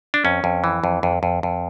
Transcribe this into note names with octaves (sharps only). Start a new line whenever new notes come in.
D4
F2 C#4
F2
E3
F2
F2
F2
F2